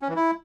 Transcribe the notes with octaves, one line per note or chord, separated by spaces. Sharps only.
C#4
E3
E4